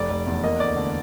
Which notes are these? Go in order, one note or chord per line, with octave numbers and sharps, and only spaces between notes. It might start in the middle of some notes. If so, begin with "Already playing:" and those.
Already playing: F1 D5
F1
E2
A#3 D#5
D2 D5
D3